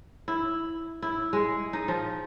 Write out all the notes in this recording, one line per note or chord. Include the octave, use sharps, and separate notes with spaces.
E4
E4
G#3
D#4
F3